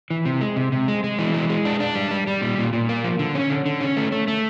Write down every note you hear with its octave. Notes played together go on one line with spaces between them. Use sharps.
E3
C3
G#3
C3
C3
G#3
G#3
E3
G#3
G#3
D4
D4
G3
G3
G3
A#2
A#2
A#2
A#3
F3
D3
C#4
D3
D3
C#4
A3
A3
A3